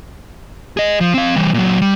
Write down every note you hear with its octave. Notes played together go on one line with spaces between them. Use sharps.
G#4 D#5
F3
C4 F5
E3 G3
A#2 F#3
G3